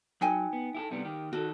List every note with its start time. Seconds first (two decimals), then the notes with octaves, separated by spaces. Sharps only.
0.21 F#3 D#4 G5 G#5
0.53 B3
0.75 E4 G4 A4
0.91 C3 G3 B3
1.05 D#3 G4
1.33 D#3 F#4 A4